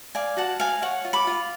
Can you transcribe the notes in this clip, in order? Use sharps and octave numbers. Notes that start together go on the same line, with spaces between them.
D5 F5 G#5
F#4 F#5 A5
F#4 F5 G#5
C#5 F#5
F4
B5 D6
F4